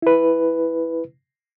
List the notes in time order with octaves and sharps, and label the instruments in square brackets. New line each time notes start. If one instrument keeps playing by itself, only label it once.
[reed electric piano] E4 B4